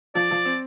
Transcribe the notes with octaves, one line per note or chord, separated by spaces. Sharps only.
F3 D5
F3
C4